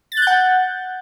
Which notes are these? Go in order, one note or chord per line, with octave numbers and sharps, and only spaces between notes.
A6
F#6
G6
F#5